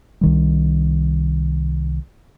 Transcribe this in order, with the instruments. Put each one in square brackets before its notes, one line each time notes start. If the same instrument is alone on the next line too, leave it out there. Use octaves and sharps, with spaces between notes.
[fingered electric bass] C2 D#3 G3